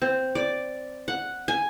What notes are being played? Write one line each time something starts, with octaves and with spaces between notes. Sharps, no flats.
C4
D5
F#5
G#5